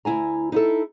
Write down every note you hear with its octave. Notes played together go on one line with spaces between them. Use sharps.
D2 E4 G#5 A#5
D#4 E4 A4